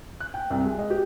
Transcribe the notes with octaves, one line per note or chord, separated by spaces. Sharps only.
F#6
G5
C2
G#3
D#5
G4